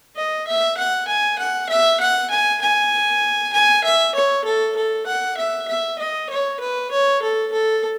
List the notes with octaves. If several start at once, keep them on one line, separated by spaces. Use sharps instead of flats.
D#5
E5
F#5
G#5
F#5
E5
F#5
G#5
G#5
G#5
E5
C#5
A4
A4
F#5
E5
E5
D#5
C#5
B4
C#5
A4
A4